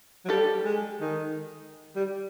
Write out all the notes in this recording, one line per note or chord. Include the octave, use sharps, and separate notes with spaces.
F#3
G3 G4 A4
G#3
D#3
G3